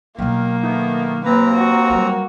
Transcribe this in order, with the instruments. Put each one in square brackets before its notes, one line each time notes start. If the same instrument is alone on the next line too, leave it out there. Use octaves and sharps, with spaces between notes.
[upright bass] B2 F#3 [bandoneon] D#3 [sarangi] A#3
[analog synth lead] D#3 [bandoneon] A3 B3
[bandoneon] D#2 C4 A#5 [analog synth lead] A#3 [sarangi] B4
[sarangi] F#4
[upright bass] F#3 G3